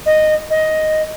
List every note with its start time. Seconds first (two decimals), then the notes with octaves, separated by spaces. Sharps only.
0.06 D#5
0.50 D#5